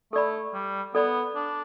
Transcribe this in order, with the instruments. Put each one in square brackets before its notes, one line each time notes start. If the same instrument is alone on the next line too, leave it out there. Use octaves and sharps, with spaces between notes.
[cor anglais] A3 [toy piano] A4 D5 B5
[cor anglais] G3
[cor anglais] B3 [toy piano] A4 D5 B5
[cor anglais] D4